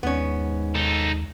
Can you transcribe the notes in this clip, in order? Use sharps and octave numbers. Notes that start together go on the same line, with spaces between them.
D#2 G#2 B3 C#4
D#4 A4